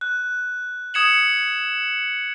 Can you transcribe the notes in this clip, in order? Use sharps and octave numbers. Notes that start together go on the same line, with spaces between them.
F#6
D#6 G#6 C#7 E7 F#7